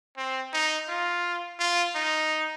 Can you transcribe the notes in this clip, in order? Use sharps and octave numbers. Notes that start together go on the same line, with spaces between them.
C4
D#4
F4
F4
D#4